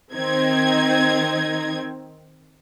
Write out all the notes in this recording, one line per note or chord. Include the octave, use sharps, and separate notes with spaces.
D#3 C4 D#4 G#6